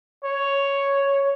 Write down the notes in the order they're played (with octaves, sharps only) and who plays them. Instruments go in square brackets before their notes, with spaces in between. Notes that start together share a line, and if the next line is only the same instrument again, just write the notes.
[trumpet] C#5